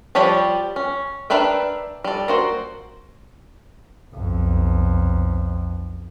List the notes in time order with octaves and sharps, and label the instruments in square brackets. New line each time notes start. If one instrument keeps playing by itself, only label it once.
[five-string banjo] F3 G3 G4 C#5 A5
C#4
D4 A#4 B4 E5 G5
G3 A4
A#3 F#4 C5
[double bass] B1 F2